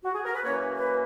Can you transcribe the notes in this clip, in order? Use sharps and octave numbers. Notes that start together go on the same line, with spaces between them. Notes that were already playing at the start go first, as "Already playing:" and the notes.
F#4
G#4
A#4
B4
F#2 E3 A#3 C#4 C#5
B4